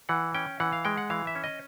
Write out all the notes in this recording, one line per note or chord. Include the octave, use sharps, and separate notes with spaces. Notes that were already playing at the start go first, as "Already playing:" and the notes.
E3 F#5
C#4 G5
E3 F#5
F5
G#3 G5
F#5
E3 F5
E5
C#4
D#5